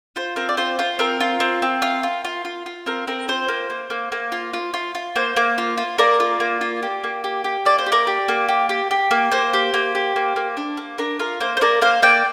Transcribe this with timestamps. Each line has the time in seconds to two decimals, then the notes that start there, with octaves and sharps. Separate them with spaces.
0.16 F4 C5
0.36 C4 A#4
0.49 D5
0.57 F4 C5
0.79 F4 C5
0.99 C4 A#4
1.20 F4
1.40 C4
1.62 C4
1.82 F4
2.03 F4
2.25 F4
2.45 F4
2.66 F4
2.86 C4 A#4
3.07 C4 A#4
3.28 F4 C5
3.48 A#3
3.70 A#3
3.90 A#3
4.12 A#3
4.32 F4
4.53 F4
4.74 F4
4.95 F4
5.16 A#3 C5
5.36 A#3
5.58 F4
5.78 F4
5.98 A#3 A#4 D5
6.20 F4
6.40 A#3
6.61 F4
6.83 G4
7.04 A#3
7.24 G4
7.44 G4
7.65 A#3 D5
7.78 C5
7.86 G4
7.92 A#4 D5
8.07 G4
8.28 A#3
8.48 G4
8.69 G4
8.91 G4
9.11 A#3
9.32 A#3 C5
9.53 G4
9.74 A#3
9.95 G4
10.16 A#3
10.36 A#3
10.57 D4
10.77 A#3
10.98 D4 A#4
11.19 F4 A#4
11.41 A#3 C5
11.57 C5
11.61 A#3 A#4 D5
11.81 A#3 C5 F5
12.02 A#3 D5 G5